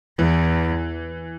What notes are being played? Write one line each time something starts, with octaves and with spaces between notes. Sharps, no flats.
E2 E3